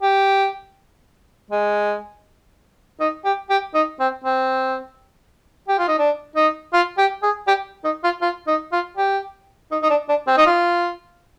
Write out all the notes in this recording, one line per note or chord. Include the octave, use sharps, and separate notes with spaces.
G4
G#3
D#4
G4
G4
D#4
C4
C4
G4
F4
D#4
D4
D#4
F4
G4
G#4
G4
D#4
F4
F4
D#4
F4
G4
D#4
D#4
D4
D4
C4
D#4
F4